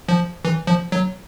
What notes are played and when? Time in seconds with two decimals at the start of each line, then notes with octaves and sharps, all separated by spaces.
0.09 F3
0.45 E3
0.67 F3
0.92 F#3